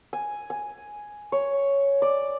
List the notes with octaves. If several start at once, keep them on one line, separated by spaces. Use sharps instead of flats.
G#5
G#5
C#5
D5